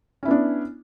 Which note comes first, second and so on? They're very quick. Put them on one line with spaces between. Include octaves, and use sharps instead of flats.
C#4 E4 B3 D4